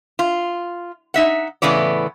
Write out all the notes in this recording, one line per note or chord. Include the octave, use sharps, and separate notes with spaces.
F4
D#4 E5 F#5
A2 C#3 E3 B3 D5